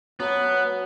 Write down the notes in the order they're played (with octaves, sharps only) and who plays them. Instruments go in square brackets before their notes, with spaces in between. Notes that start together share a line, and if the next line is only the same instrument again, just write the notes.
[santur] F#3 A5 B5 [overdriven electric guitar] B3